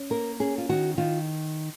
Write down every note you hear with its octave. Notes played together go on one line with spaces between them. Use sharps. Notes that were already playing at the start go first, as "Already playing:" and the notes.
Already playing: C#4
A#3 A#4
C#4 G#4
F4
D#3 F#4
D#3 F4